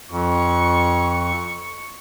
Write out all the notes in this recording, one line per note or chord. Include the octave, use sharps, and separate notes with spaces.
F2 C#6